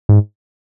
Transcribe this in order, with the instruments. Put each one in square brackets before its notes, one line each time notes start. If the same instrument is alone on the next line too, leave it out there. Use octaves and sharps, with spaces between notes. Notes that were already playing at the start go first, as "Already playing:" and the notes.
[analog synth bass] G#2